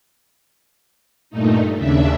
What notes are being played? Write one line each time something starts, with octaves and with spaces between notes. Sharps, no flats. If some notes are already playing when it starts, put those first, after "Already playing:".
G2 A#2 A3 D#4
D#2 C#3 D4 E5